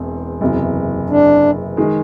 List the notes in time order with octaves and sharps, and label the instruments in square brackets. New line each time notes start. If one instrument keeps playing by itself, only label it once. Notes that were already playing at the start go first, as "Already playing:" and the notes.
Already playing: [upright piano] E1 E2 C4
F#1 E2 C3 E3
[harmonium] D4
[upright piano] D#3 G#3